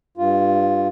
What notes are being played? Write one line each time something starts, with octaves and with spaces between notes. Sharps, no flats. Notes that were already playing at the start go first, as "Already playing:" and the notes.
G2 F4